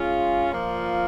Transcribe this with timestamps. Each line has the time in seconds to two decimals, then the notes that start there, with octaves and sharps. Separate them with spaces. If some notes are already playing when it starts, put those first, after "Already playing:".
Already playing: G#3 C#4 F4 G#4
0.53 A#2 F3 A#3 F4